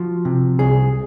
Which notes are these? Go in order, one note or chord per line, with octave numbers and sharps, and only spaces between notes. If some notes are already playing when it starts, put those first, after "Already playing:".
Already playing: F3 F#4
C3
C2 G#4